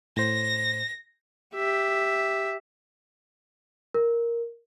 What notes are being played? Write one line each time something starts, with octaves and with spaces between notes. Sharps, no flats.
A2 C5 A#6
G4 E5
A#4